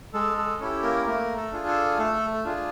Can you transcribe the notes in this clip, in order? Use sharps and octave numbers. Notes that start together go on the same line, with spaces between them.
G#3 A4
A4
C#4 E4 G4 A4
A#3 A#4
A3 A#3 A#4
A4
D4 F4 G#4
A4
A3 A4
D4 F4 G#4